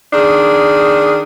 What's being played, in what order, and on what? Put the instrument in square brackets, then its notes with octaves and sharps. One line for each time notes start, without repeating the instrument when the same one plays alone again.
[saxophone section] D#3 D4 G#4